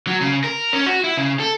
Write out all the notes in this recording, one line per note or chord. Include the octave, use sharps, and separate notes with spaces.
F#3
C#3
A#4
C#4
F#4
E4
C#3
A4